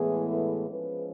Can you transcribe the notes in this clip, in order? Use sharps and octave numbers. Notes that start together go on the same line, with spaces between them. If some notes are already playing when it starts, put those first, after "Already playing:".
Already playing: A2 E3 G#3 B3 G#4
A4
F3 G#3 C#4 B4